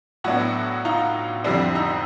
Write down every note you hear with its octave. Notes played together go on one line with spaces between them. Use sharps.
A2 F#3 B3 D4 E4 F#4
D#4 F4
F2 D3 G3 C4 D4 E4
D#4